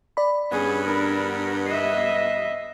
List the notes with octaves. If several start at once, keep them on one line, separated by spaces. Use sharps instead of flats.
D5 B5
G2 B3 C#4 G#4
D4 A#4
D#5 E5 C7